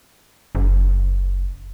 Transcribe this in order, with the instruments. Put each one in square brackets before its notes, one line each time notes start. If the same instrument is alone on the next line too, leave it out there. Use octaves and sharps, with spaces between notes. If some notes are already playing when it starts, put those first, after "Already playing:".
[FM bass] F#1